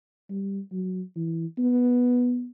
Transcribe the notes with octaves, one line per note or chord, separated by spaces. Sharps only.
G3
F#3
E3
B3